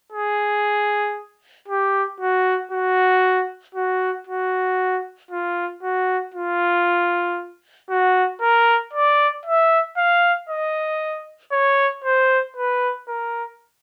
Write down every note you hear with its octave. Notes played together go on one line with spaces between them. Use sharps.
G#4
G4
F#4
F#4
F#4
F#4
F4
F#4
F4
F#4
A#4
D5
E5
F5
D#5
C#5
C5
B4
A#4